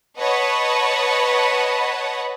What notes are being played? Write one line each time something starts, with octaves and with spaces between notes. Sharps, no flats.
B4 C#5 D#5 F#5 A5 B5